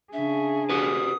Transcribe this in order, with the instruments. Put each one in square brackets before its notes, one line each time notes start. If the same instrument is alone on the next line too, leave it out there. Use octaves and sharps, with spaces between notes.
[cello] C#3 G#4 [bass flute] D4 [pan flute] E5
[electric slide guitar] F#4 G4 B4 [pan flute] D#6